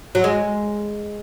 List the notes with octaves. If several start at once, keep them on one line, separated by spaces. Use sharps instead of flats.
F#3
G#3